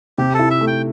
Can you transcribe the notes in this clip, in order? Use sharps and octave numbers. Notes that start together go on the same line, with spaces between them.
C3 G4
A4
E4
E5
A3
G5